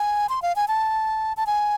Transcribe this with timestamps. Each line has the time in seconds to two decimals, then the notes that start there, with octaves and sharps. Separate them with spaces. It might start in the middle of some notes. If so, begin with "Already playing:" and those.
Already playing: G#5
0.29 C6
0.42 F5
0.56 G#5
0.68 A5
1.37 A5
1.47 G#5